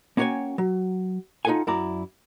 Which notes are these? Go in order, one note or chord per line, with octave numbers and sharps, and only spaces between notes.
A#3 C#4 F#4 C#5 G5 G#5
F#3
D#4 F4 G#4 A4 F#5 G#5
F#2 E4 D5 A#5